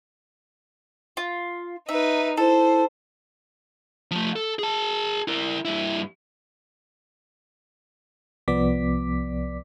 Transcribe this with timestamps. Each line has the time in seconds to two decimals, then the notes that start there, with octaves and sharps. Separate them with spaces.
1.17 F4
1.89 D#4 B4 E5
2.37 E4 A4 C5
4.11 F3 A3
4.36 A4
4.59 G#4 A5
5.28 E4 A#4
5.65 G2 E4
8.48 C2 F3 B3 D5 D6 B6